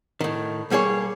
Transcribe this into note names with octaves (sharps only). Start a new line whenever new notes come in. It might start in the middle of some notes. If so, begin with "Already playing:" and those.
A2 D#3
B1 G3 A#3 G#4 C#5